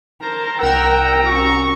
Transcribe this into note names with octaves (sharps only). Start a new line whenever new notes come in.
A#4 C5 A5 A#5
C2 A#4 F#5 G5 A#5 E6
C#4 F#4 C#6